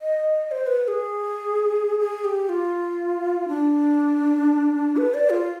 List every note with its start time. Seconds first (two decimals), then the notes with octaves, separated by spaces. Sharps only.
0.02 D#5
0.51 C5
0.67 B4
0.84 B4
0.88 G#4
1.99 G#4
2.24 G4
2.49 F4
3.48 D4
4.97 B4
5.14 D5
5.30 F4